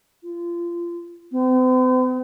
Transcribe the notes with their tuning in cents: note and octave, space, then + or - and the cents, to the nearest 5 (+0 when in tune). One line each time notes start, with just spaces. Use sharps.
F4 -25
C4 -45